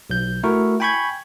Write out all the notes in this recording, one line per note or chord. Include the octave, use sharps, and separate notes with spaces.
B1 G6
A3 E4 F#4 A#4 C#6
G5 G#5 B5 C#6 G6 G#6